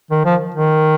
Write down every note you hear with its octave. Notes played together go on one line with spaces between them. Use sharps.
D#3
F3
D#3